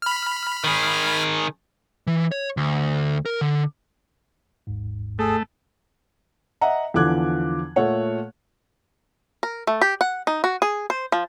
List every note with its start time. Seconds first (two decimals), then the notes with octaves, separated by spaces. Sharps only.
0.02 B5 F6
0.64 D#3 G#4
2.07 E3
2.32 C#5
2.57 D2
3.26 A#4
3.41 D3
4.67 G#1 D#2 G#2
5.19 A3 G#4 A4
6.61 D#5 E5 F#5 A#5
6.94 E2 D3 F3 D6 F#6 G#6
7.76 A#2 A3 C#5 F#5
9.43 A#4
9.67 A3
9.81 G4
10.01 F#5
10.27 D#4
10.44 F#4
10.62 G#4
10.90 C5
11.12 F3